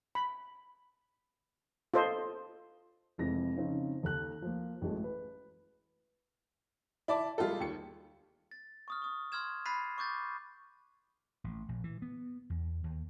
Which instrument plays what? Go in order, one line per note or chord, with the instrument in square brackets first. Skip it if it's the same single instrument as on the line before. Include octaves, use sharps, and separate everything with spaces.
[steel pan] B5
F4 A4 C5 D#5
[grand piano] F1 F2 E3 G#3 A#6
C#3 F3 C4 C#4 D#4
D#2 A4 F#6
F3 A#3
A1 F#3 G#3 A3
B4
[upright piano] E4 D5 A5 D6
G3 G#3 F4 G4 A4
D#2 C#7
[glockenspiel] A6
C#6 D#6 F6
C#6 D#6
C6 E6 F6 G#6 E7
B5 F#6 A6 B6 C7 D#7
C#6 D6 G6 A6
[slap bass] A1
A#1
E3
B3
E2
D#2